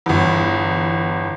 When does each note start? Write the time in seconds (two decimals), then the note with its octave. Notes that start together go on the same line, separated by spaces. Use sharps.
0.06 G1 E2